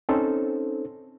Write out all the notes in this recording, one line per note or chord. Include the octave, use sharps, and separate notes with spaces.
C4 C#4 D#4 A4 C5